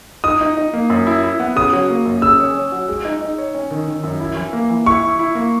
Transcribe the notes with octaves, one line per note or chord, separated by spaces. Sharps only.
D#4 D#6
D#4
D#4
A#3
F#2
E4
E4
B3
C#3 D#6
F#3
A#3
F#2
C#3 E6
C#4
C#4
F#3
G#3
D#4
D#4
C#5
C#4
D#3
D#3
F#2
E4
E3
A#3
E3
E4 C#6
E4
E4
A#3